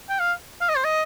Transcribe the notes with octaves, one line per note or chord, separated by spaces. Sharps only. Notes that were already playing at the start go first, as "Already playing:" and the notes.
G5
F5
F5
D#5
C5
D#5